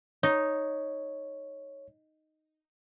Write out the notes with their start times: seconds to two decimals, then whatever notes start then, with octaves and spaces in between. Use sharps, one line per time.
0.23 D#4 C#5